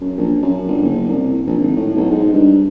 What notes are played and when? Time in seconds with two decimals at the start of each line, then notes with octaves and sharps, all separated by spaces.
0.01 F#2
0.18 A#1
0.43 F#2
0.68 G1
0.83 F#1
1.09 C2
1.47 A#1
1.61 G#1
1.76 A2
1.96 B1
2.10 G#2
2.33 G2